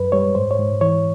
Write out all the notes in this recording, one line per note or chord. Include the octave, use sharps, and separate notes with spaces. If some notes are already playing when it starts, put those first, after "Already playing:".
Already playing: F#2 B4
G3 C#5
G#2 C5
C#5
G#2
E3 C#5